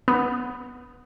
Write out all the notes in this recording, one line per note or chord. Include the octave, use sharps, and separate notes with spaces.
B3